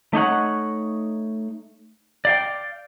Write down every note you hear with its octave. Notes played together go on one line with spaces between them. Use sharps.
A3 D#4 C#5 F#5
D5 F5 G5